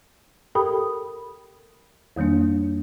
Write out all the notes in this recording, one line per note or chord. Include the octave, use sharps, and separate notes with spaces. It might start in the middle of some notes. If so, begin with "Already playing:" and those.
G4 A4 A#4 G5 B5 D#6
F2 D#3 G3 A#3 D4